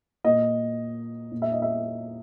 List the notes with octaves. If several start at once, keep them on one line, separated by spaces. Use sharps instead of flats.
A#2 D#5
A#2
E5
D#5
E5